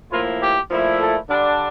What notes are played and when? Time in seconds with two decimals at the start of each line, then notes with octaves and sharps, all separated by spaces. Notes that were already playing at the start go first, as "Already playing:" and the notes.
0.11 A2 F3 A#3 E4 F4
0.41 G4
0.70 A#2 F3 A3 E4
0.99 A4
1.29 D3 G3 D4